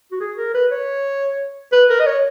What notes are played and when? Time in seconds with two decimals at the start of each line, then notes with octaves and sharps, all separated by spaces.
0.11 F#4
0.20 G#4
0.37 A#4
0.54 B4
0.71 C#5
1.72 B4
1.89 A#4
2.00 D#5
2.06 C#5